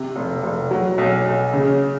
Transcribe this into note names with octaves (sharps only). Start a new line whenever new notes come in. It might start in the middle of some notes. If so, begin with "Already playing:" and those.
Already playing: C3
F1
F1
F#3
B1
B1
C#3